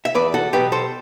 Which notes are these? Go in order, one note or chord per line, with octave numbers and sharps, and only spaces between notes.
E5
E2 B4 D5
F#4 A4
B2 F#3 B3 G4 B4
A4 C5